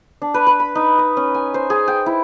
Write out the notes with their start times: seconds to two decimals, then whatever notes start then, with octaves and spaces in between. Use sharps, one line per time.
0.22 D4
0.34 B4
0.47 B4
0.60 B5
0.75 D#4
0.99 D#5
1.17 C#4
1.35 G#5
1.54 C5
1.70 G#4
1.88 G5
2.06 E4